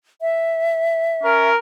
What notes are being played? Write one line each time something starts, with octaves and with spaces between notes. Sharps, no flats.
E5
C#4 A#4